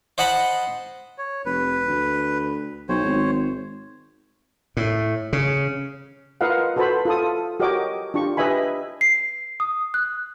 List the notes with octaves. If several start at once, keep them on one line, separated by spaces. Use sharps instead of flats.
C5 D#5 F#5 A5 B5
C#5
F1 B4
D2
B1 C5 C#5
G#1
A2
C#3
F4 A#4 B4 D#5 F5 F#5
F#4 A4 B4 C5 A5 B5
F4 A4 D#6
F#4 G4 A#4 C#5 D#5 D6
D4 F4 G4 C#6
G4 B4 D#5 E5 G#5 B5
C7
D#6
F#6